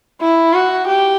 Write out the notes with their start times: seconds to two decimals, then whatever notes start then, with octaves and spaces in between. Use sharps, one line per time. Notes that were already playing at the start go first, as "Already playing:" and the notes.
0.21 E4
0.54 F#4
0.88 G4